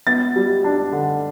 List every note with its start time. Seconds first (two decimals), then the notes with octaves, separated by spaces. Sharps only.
0.07 B3 A6
0.36 G3
0.64 D4
0.92 D3